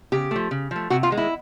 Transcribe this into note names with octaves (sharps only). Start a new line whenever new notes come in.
C#3 G4
F3 A3
C#3
F3 A3
C3 F#4
F4
D#3 G#3
E4